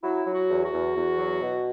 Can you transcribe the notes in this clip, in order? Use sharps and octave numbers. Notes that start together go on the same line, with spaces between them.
F#3 E4
F#3
F#4
E2
F#4
E2
E2
F#3
B2